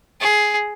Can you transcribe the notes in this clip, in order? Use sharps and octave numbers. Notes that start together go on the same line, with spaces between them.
G#4